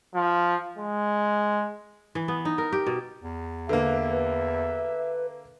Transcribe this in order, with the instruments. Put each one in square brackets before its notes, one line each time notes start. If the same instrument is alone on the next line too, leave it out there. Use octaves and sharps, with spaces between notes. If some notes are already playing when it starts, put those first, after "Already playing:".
[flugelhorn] F3
G#3
[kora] E3
B3
D#4
A#4
G4
B2
[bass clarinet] E2
[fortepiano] D3 A#3 [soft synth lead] B4 [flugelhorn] E5
[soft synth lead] B4